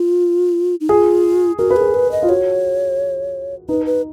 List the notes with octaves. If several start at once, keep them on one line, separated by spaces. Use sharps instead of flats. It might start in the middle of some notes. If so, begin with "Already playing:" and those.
Already playing: F4
D#4
F4 G#4
F#4 A#4
B4
G#4 A#4
B4
D#5
F4
F#4 C#5
D#4 B4
B4